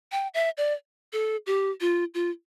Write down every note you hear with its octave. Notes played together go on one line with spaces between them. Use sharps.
G5
E5
D5
A4
G4
F4
F4